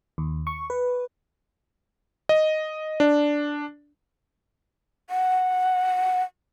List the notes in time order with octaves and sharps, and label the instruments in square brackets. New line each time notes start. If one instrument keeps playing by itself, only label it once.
[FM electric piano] D#2
C#6
B4
[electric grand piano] D#5
D4
[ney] F#5